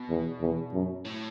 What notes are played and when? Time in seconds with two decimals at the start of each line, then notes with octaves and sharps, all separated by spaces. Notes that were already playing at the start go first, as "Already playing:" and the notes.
Already playing: B2
0.10 E2
0.41 E2
0.73 F#2
1.05 A2